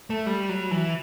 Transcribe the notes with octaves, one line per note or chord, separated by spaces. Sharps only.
A3
G3
F#3
E3